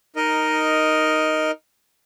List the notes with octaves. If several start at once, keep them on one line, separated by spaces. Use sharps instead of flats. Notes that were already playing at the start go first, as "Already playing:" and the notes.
D#4 A#4 D#5